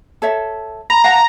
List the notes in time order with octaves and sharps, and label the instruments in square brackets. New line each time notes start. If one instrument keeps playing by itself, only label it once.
[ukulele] A4 C#5 E5
[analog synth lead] A#5 [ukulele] B5
[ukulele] F5 F#5 A5